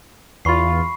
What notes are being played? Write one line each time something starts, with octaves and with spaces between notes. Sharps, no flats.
E2 F4 B5 C#6 C7